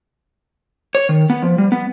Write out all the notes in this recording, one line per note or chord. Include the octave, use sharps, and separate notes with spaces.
C#5
D#3
B3
F3
G3
B3